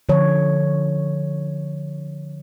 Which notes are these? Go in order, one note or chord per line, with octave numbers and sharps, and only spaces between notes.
D3 F3 C#5